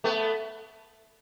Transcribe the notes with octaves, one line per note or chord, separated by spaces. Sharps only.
A3 B3